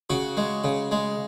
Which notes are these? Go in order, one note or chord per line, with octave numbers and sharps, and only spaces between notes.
C#3 F#4
G#3
C#3
G#3